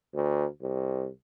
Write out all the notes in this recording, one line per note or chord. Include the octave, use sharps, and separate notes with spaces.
D2
C2